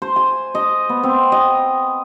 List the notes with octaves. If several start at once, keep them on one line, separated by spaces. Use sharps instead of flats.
C5
G#5
D#5
B3
C4
D#5